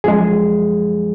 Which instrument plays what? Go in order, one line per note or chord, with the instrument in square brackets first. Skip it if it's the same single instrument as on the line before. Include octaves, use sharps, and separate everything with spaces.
[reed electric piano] F#2 F3 G#3 G#4